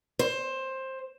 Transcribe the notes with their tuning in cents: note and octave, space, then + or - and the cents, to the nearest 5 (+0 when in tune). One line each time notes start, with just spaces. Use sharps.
C5 +15